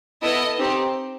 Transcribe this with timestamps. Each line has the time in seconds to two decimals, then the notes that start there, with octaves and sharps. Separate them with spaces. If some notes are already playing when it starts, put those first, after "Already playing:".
0.22 B3 E4 A4 D#5
0.58 C4 D#4 G4